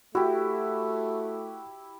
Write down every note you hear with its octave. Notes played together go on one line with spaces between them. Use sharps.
A3 E4 F#4 G4